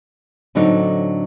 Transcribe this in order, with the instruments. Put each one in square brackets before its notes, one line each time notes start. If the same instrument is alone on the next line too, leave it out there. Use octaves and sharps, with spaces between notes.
[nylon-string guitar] A2 D3 F#3 C4 D4 D#4